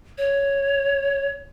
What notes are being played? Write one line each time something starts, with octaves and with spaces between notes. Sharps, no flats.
C#5